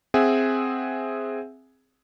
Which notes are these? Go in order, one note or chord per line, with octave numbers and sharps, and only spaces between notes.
C4 G#4 E5 F#5 G#5